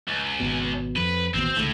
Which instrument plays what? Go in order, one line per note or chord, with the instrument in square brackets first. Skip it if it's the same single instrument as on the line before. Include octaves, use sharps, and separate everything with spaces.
[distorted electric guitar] C#2
[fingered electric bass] G#1 B2
[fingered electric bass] F2 [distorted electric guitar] B4
[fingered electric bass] A1 D#2 B2 [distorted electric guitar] C4
[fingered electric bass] C#2 D3 [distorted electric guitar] A2 A3